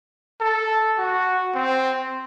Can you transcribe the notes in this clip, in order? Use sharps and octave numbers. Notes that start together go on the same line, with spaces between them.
A4
F#4
C4